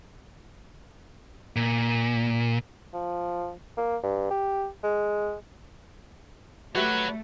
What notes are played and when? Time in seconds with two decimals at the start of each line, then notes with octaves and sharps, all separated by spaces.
1.56 A#2
2.93 F3
3.77 A#3
4.03 G2
4.30 G4
4.83 G#3
6.75 A3 F#4 G4 B4 C#5 E5 F#5